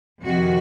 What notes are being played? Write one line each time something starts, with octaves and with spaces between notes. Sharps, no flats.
F2 C3 D#3 F#4